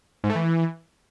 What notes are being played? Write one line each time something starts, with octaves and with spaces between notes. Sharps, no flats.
G#2
A3
E3